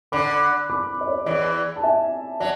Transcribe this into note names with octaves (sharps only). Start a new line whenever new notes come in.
D3 B5 D6
B5 D6
D5
C#5
E2 E3 D5
A5
E5 G#5
F#3 D5